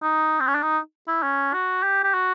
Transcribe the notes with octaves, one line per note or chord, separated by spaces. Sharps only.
D#4
C4
C#4
D4
D#4
E4
C#4
F#4
G4
G4
F#4